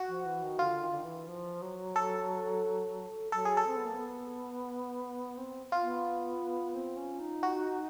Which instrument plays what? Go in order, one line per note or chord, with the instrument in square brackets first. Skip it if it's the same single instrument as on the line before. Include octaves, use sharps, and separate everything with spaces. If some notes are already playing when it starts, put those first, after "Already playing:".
Already playing: [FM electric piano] F#4
[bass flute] F3
E3
D#3
[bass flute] D3 [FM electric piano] F4
[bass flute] D#3
D3
D#3
E3
F3
F#3
[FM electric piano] A4
[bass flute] F#3 [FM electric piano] A4
[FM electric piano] G#4
A4
[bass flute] C4
B3
A#3
B3
C4
[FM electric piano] F4
[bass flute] B3
C4
C#4
D#4
[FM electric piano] F#4